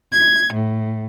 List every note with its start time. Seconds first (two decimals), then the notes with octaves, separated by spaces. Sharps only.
0.12 G#6
0.53 A2